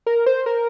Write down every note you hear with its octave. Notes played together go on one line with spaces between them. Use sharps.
A#4
C5
A#4